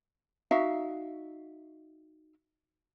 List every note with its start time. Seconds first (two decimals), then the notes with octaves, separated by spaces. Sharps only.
0.51 D#4 F#4 E5 F5